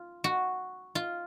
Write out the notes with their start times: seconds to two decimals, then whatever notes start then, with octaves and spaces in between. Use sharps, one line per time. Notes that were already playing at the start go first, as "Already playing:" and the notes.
Already playing: F4
0.24 F#4
0.95 F4